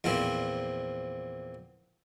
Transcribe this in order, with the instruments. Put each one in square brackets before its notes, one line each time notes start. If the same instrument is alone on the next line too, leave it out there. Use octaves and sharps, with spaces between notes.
[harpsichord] E2 A#2 F3 C4